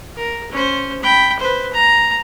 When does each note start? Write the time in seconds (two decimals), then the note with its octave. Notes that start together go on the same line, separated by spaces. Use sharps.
0.17 A#4
0.52 C#4 C5
1.02 G5 B5
1.40 B4 C5
1.74 A#5